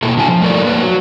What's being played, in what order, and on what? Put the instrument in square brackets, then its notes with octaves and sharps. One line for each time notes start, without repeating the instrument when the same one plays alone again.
[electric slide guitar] B2 A#3 B3 E4 A4
D3 F#3 F5 G#5 A5
F3
A3 A4 A#4 D5
F3 A#3 B4
F#3